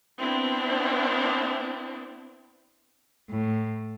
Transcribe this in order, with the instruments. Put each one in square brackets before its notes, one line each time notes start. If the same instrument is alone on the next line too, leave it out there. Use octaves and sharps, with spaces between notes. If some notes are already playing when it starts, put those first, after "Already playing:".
[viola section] B3 C4 D4 E4
[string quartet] A2